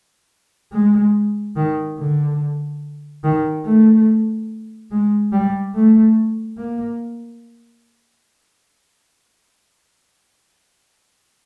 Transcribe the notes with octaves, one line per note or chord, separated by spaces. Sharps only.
G#3
D#3
D3
D#3
A3
G#3
G3
A3
A#3